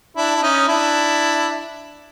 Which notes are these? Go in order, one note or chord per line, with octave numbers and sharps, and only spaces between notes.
D4 E4
D4
C#4 D#4
D4 E4